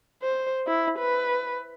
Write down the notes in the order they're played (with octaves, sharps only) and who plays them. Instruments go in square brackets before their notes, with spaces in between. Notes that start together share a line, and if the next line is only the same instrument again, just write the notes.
[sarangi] C5
E4
B4